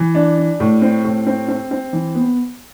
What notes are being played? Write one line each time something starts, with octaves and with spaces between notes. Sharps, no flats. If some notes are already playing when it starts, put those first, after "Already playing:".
Already playing: E3
D4
D4
A2
C4
A2
C4
C4
C4
E3
B3